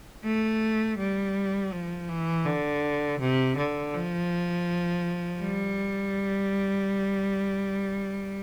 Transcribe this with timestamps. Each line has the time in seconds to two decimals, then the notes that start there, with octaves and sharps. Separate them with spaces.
0.24 A3
0.98 G3
1.72 F3
2.09 E3
2.45 D3
3.20 C3
3.57 D3
3.93 F3
5.41 G3